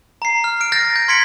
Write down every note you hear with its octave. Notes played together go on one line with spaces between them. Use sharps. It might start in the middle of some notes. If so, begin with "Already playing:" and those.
A#5 C7
F6
F6 D7
F6 G6 A6 A#6
G6 A#6
C6 G#6 B6 C#7 D7 F#7